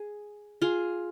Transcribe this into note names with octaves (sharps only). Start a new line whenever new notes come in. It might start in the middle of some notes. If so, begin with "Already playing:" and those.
Already playing: G#4
F4 G#4